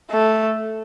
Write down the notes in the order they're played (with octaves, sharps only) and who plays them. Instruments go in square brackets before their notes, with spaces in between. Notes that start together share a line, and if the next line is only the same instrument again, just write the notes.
[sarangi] A3